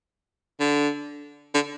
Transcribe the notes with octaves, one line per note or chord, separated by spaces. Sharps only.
D3
D3